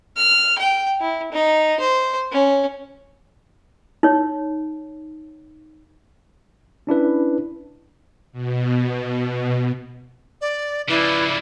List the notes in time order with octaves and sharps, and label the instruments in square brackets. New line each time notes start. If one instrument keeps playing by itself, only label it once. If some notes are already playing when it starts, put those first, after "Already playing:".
[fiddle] F6
G5
E4
D#4
C5
C#4
[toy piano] D#4 C#5
[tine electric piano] C#4 D4 E4 B4
[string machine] B2
[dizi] D5
[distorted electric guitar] C#3 F3 [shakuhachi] E4 [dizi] B4 [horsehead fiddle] D5